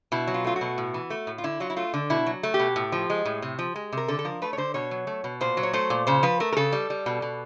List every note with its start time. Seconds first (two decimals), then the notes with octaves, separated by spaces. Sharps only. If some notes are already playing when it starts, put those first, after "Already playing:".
0.12 B2 E4
0.28 F#3
0.34 F4
0.44 A3 F4
0.56 F#4
0.61 B2
0.78 A2
0.94 E3
1.10 A3
1.27 A2
1.38 F4
1.44 D3 E4
1.60 F#3 F4
1.70 E4
1.77 A3 F4
1.94 D3
2.10 B2 E4
2.26 F#3
2.43 A3
2.54 G4
2.59 B2
2.76 A2
2.92 F3
3.10 G#3
3.25 A2
3.42 C3
3.59 F3
3.76 G#3
3.93 C3 A#4
4.08 D3 A4
4.19 A4
4.25 F3 A#4
4.42 A3 B4
4.53 C#5
4.57 D3 C5
4.74 B2 C#5
4.91 F#3
5.07 A3
5.24 B2
5.41 A#2 C5
5.57 F#3
5.63 C#5
5.73 A3 C5
5.90 A#2
6.07 C#3 C5
6.23 F3 B4
6.40 A3 A#4
6.52 A#4
6.57 C#3 A4
6.72 G3
6.90 G3
7.06 B2
7.22 B2